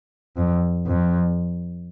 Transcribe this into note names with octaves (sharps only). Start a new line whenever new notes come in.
F2
F2